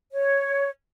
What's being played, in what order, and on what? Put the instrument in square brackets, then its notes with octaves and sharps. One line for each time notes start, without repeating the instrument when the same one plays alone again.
[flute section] C#5